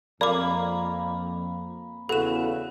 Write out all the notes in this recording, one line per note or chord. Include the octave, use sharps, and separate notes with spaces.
F2 A#3 D5 F5 A#5 B5 D6
E2 C#3 F#4 A4 B4 E7